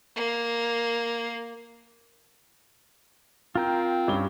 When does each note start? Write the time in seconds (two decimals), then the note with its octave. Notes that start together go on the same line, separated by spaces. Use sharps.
0.16 A#3
3.55 C4 F4 A#4 G5
4.08 G2 C#4 G7